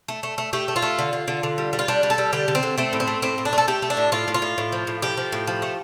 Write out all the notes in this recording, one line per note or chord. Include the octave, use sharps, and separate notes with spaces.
A3
A3
A3
A3 G4
A3
F4
A3
D3
D3
D3
D3
G3
G3
F4
G3 D4
G3
A4
G3
D3 G4
D3
C4
D3
A3 C4
A2
C4
A3
A2 C4
A2
D4
A3
A4
A3 G4
A3
D4
A2
A2 F4
A2
F4
A2
A2
F3
A2
F3 G4
F3
A2
F3
A3